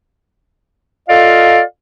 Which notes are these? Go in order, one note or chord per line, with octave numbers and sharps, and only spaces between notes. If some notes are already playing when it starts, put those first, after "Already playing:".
F4 A4 D5 D#5 F5